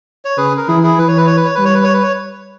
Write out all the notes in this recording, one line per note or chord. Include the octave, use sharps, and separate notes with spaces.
C#5
C#3 G#4 B4
A#4
E3 E4 G#4
E4 G#4
E3 B4
C#5
B4
C#5
B4
C#5
G3 B4
C#5
B4
C#5
B4
C#5